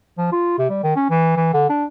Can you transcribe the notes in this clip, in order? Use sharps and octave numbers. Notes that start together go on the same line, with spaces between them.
F3
F4
C3
G3
D#3
C#4
E3
E3
D3
D4